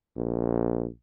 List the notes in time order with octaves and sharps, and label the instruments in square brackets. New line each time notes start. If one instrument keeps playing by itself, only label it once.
[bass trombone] A#1